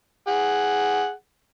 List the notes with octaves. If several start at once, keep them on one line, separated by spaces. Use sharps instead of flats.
G#4 F#5